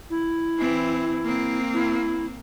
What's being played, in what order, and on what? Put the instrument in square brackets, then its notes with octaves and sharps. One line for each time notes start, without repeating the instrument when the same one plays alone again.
[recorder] E4
[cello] E3 C4
A#3 C4
[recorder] E4